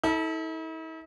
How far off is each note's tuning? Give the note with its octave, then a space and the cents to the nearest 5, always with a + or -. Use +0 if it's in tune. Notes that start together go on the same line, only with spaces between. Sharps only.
E4 -45 A4 +0